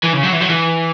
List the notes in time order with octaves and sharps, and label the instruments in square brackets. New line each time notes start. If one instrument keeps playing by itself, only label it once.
[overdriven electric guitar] E3
C#3
F#3
E3
F#3
E3